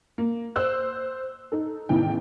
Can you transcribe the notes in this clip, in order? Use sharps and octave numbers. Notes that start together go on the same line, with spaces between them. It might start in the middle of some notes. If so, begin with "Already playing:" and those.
A#3
C5 E6 F#6
D#4 A4
A1 E2 D#3 E3 G5